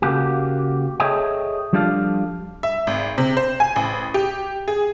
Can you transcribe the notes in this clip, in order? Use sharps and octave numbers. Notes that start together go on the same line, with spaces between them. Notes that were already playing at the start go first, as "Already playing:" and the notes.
C#3 A#3 F#4 G4
G#4 A4 C#5 D#5 E5 G5
F3 G3 D4 F4 A4 F5
E5
G#1
C3
C5
G#5
A1
G4
G#4